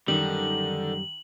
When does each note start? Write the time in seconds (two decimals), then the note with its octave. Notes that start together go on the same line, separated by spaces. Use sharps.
0.08 F#2 D3 D#3 G3 F#7